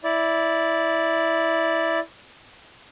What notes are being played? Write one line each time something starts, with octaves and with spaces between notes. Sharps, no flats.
E4 D5